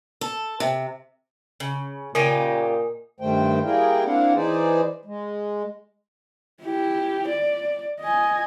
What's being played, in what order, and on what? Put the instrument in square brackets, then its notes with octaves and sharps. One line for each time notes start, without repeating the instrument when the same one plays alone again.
[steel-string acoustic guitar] A4
C3
[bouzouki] C#3
[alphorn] A#2 [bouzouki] C#3 F4 G4 [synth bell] A#4 [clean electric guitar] D#5 G5 G#5
[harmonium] G2 D#3 G3 A3 C5 G5
G3 A#3 E4 G#4 A#4 G5
A#3 C4 D4 E4 F5 F#5
E3 D#4 G#4 B4 C5 D5
G#3
[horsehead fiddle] E4 G4
D5
D#5 G#5